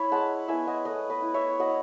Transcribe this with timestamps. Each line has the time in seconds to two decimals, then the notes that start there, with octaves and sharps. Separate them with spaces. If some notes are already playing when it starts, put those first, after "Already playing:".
Already playing: E4 C#5 E5 B5
0.12 G#3 F#5 A5
0.48 B3 E4 E5 G#5
0.67 D#5 F#5
0.85 A3 B4 D#5
1.10 B4 D#5
1.22 E4
1.34 C#5 E5
1.59 F#3 D#5 F#5